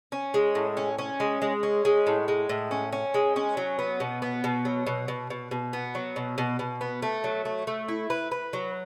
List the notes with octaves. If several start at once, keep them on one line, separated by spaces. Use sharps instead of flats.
C#4
G#3
A2
C#4
C#4
G#3
G#3
C#4
G#3
A2
G#3
A2
C#4
C#4
G#3
C#4
F#3
B3
B2
B3
B2
F#3
B2
B2
B2
B2
B3
F#3
B2
B2
B2
B3
A3
F#3
A3
A3
E4
B4
B4
F#3